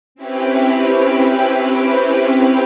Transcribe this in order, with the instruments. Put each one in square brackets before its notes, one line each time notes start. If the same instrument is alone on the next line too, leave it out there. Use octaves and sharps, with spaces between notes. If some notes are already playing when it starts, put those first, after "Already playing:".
[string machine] C4 C#4 E4 G4 B4